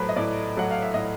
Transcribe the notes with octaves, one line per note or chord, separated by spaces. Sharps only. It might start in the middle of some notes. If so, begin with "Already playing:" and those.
Already playing: A2 F#3 A3 B4 C5
D#5
A2 D5
F#3 A3 F#5
F5
E5
A2 D#5